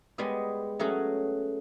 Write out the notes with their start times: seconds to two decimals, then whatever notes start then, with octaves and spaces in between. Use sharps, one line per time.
0.18 G3 G#3 B3 G#4 D#5
0.79 F#3 A3 C#4 F#4 G#4